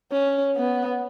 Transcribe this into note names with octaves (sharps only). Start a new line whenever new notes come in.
C#4
B3